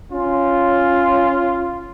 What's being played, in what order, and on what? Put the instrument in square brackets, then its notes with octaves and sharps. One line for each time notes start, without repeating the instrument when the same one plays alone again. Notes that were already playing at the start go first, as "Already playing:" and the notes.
[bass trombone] C#4 [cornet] F4